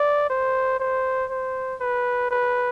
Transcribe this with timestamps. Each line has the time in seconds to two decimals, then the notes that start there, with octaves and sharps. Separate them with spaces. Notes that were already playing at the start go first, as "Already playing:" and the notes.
Already playing: D5
0.30 C5
0.80 C5
1.30 C5
1.80 B4
2.31 B4